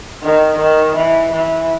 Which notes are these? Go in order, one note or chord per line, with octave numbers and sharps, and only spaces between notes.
D#3
D#3
E3
E3